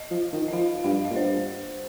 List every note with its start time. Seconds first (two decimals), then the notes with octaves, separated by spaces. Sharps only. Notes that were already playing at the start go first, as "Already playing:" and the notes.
Already playing: D#5
0.10 F3
0.32 D#3
0.48 D#5
0.52 F3 F5
0.84 G2 F5
1.05 A#2 D#5
1.16 G2 C5